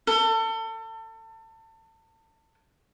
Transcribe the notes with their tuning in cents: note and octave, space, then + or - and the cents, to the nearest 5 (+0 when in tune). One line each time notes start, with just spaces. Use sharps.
A4 +30